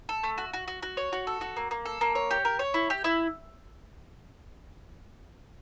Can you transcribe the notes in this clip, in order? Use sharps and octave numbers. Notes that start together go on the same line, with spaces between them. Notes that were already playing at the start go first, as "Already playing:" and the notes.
A4
A3
F#4
F#4
F#4
F#4
C#5
F#4
A4
F#4
A#3
A#3
A4
A#3
C#5
G4
A#4
C#5
E4
G4
E4